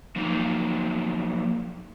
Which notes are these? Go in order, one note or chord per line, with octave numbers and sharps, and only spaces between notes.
F3 F#3 A#3 D#4